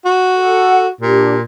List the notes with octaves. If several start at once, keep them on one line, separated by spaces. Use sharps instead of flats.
F#4
A4 F#5
A#2 D4 G4